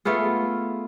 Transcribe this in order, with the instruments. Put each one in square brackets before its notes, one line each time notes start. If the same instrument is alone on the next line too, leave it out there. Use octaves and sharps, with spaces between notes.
[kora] A3 B3 F4 G#4